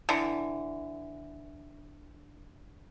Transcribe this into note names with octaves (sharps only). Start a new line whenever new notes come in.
D3 E3